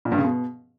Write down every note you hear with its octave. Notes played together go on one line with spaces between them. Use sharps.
A#2
G2
C#3
B2